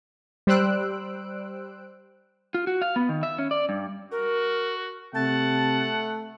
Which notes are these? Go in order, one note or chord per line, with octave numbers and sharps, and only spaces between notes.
G3 C5 E6 F#6 D7
F4
F#4
F5
B3
D#3
E5
C#4
D5
G2
F#4 A#4
C3 A3 F#5 A5